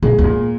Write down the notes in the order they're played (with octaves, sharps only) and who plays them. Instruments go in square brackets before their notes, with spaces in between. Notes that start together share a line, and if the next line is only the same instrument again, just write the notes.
[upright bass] A#2 [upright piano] G#3
[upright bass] E2
[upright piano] A#2